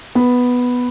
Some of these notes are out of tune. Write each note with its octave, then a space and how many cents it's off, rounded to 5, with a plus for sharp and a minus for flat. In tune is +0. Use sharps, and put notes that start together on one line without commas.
B3 +0